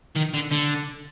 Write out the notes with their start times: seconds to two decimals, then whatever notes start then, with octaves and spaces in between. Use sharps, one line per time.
0.16 D#3
0.34 D3
0.51 D3